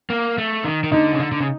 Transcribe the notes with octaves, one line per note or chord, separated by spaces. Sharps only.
A#3
A3
D#3
D#3
D3 D#4
C#3
D3
D3
C#3